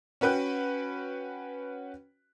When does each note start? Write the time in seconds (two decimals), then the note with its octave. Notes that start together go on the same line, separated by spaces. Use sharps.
0.21 C#4 F#4 B4 G5 F#6